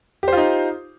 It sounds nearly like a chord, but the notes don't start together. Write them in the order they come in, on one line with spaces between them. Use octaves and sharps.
G4 C5 F4 D#4